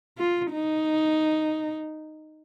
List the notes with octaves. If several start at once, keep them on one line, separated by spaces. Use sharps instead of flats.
F4
D#4